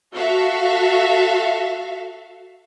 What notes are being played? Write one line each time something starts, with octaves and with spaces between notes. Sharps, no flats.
F#4 A4 E5 F5